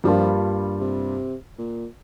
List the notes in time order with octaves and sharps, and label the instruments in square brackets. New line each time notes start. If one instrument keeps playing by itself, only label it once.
[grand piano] G2 G3 A#3 D4 F4 [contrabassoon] F3
[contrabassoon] C3
A#2